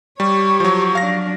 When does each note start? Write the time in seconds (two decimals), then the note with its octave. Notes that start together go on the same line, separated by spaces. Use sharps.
0.20 G3 G4 C#5 C#6
0.60 F3 F#3
0.95 F#3 D4 F5 A#6